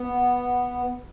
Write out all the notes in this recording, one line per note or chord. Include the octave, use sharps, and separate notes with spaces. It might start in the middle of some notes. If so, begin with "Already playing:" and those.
Already playing: B3